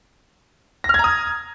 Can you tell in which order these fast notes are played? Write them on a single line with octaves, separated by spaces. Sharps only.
A#6 F6 G#6 A#5 D#6